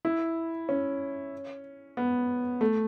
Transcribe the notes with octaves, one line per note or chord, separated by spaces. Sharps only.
E4
C#4
B3
A3